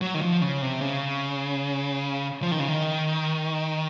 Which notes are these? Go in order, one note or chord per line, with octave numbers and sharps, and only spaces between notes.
F#3
D#3
F3
C#3
C3
C#3
F3
D#3
C#3
D#3